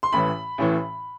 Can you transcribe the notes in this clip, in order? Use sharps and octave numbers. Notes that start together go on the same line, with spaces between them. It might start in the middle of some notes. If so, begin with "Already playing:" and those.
C6
A1 A2 E3 B5
A1 A2 E3